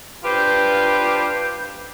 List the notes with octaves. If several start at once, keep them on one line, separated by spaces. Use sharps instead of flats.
D4 F4 G4 B4 C5